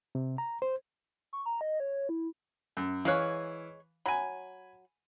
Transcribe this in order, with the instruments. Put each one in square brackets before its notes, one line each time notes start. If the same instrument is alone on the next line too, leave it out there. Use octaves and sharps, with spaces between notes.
[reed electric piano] C3
A#5
C5
[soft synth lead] C#6
A#5
D#5
C#5
E4
[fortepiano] F#2
[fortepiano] E3 F5 F#6 [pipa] G#3 C#5
[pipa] F#3 [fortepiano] G#5 B5